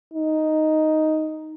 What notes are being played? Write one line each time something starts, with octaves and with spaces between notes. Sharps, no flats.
D#4